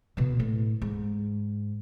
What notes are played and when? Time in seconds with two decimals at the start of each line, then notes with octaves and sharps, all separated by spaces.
0.17 B2 D3
0.39 A2
0.82 G#2